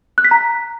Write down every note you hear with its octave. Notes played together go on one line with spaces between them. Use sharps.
F#6
B6
A#5